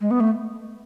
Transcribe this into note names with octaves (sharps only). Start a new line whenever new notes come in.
G#3
B3
A3